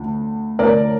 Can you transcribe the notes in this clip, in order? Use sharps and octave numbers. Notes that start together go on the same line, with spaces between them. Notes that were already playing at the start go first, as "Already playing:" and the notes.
Already playing: D2 D3 F3
D2 D3 F3 A#4 D5